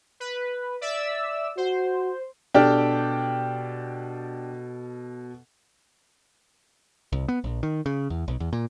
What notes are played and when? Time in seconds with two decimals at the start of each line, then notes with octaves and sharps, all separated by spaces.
0.20 B4
0.81 D5 E5 E6
1.57 F#4 C5
2.54 B2 D4 G4 A4 G5 F6
7.12 C2
7.28 B3
7.44 A#1
7.63 D#3
7.86 C#3
8.10 E2
8.28 B1
8.40 E2
8.53 A#2